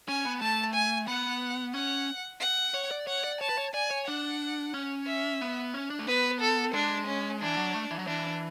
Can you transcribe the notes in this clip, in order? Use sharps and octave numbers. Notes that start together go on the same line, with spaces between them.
C#4 G#5
B3
A3 A5
G#5
B3 F#5
C#4 F#5
F#5
C#5
D5
C#5 F#5
D5
C#5 A5
B4
C#5
D5 G#5
C#5
D4 F#5
C#4
E5
B3
C#4
D4
A3
B3 B4
A4
G#3 D4
C#4
E3 D4
F#3
A3
E3
F#3
E3 D4